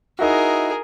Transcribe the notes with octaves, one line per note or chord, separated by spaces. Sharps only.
D#4 E4 F#4 G#4 A#4